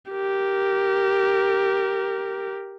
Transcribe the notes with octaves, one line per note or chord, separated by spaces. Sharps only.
G4 A#4